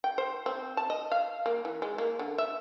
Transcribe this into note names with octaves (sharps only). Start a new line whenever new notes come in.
G5
C5
C4
A5
D#5
F5
A#3
E3
G#3
A#3
D3
E5